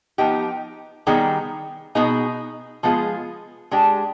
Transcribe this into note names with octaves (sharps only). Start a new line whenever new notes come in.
F3 B3 D#4 G4
D#3 G3 B3 D#4 G#4
B2 B3 D#4 G#4
F3 G#3 B3 F4 G#4
G#3 D4 G4